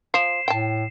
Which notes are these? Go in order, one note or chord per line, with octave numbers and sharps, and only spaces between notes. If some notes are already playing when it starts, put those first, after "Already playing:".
F3 C7 E7
A2 G5 A5